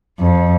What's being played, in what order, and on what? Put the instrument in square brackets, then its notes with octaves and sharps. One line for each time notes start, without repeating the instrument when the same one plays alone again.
[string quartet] F2